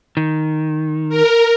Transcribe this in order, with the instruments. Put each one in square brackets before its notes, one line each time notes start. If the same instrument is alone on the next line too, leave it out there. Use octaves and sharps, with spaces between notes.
[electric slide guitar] D#3
[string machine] A#4